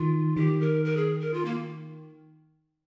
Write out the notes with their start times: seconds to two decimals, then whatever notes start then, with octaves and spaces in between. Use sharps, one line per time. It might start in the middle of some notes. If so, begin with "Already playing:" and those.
Already playing: D#3 F4
0.36 D#3 G4
0.61 A#4
0.85 A#4
0.97 G#4
1.21 A#4
1.34 F4
1.45 A#3